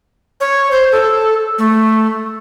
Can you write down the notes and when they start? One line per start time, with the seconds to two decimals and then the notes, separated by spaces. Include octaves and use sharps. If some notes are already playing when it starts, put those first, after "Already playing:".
0.40 C#5
0.71 C5
0.92 A4
1.58 A3